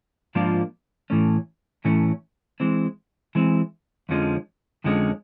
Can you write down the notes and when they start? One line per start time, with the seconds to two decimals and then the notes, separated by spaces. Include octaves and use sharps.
0.35 G#2 F3 A#3 D4 F4
1.10 A2 E3 A3 C#4
1.85 A2 E3 A3 C#4
2.60 E3 G#3 C4
3.35 E3 G#3 C4
4.09 F2 D3 F3 G#3 C#4
4.84 F2 D3 F3 G#3 C#4